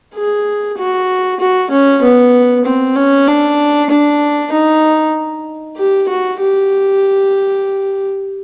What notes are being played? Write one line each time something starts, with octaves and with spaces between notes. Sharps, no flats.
G#4
F#4
F#4
C#4
B3
C4
C#4
D4
D4
D#4
G4
F#4
G4